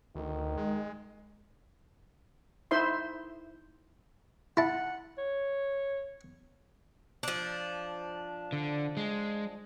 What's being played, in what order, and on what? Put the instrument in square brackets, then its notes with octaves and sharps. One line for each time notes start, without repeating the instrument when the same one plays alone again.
[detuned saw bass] D2 [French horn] D#3
[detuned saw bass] G#3
[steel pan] D#4 E4 C5 E5 C6
[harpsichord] E4 A5 [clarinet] F#5
[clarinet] C#5
[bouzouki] F3 D4
[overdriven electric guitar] D3
G#3